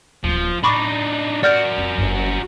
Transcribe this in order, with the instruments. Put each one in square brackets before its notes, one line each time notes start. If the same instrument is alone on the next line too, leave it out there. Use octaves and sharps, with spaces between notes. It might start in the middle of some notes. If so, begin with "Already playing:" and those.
[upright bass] D1 A#3 [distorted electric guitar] F3
[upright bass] A2 [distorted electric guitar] D4 D#4 [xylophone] B5 C#6 D6
[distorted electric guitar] F#4 A#4 [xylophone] D5 F6 G6
[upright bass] F2 F4
F#1